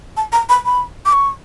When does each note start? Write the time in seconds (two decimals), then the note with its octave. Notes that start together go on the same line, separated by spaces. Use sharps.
0.17 A5
0.32 A#5
0.49 B5
0.65 B5
1.06 D6
1.13 C#6